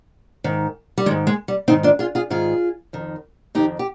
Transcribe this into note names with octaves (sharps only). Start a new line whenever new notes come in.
G#2 D#3
G3
G#2 D#3 G#3
G#3
G3
G#2 D#3 C4 D#4
D4 F4
F4 G#4
F4 G#4
G#2 D#3 F4 G#4
F2 D#3
F2 D#3 D#4 G4
G4